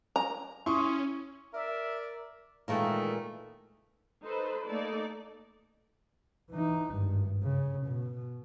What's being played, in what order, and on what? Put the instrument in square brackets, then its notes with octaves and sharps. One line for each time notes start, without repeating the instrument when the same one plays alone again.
[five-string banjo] A#5
[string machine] C#4 [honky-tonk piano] E4 [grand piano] C6 C#6 D#6
[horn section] A#4 D5 [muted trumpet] E5
[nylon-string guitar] A#2 E3 G#3 [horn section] D#3 A3
[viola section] D#4 A4 B4 C5
A3 A#3 D#4 A4 D5
[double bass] E3 D#4
G#1 G2
C#3
B2